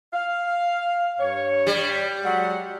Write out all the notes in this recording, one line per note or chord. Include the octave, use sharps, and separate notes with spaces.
F5
G2 C#5
G3
F#3 G#3 F#5